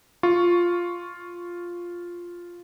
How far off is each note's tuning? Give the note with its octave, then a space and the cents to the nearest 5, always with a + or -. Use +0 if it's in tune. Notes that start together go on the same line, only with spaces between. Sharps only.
F4 +0 C#6 +0